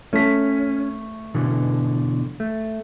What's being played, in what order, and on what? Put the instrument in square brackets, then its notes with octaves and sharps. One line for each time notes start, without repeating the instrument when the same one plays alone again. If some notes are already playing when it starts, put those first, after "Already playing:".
[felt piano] A3 B6 [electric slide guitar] C#4
[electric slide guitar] B2 D3 E3
A3